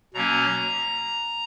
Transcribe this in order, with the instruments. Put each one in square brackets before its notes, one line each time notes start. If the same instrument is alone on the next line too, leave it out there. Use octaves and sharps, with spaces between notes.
[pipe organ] B2 F#3 A#3 C#4 A#5